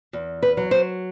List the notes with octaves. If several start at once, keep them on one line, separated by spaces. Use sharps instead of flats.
E2
B4
F#3
C5